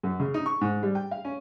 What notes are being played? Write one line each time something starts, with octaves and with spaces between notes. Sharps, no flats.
F#2
C#3
D#4
C#6
G#2
G3
G5
F5
C#4